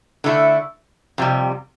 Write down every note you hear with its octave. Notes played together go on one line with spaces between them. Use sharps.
D3 A3 E4
F2 C3 G3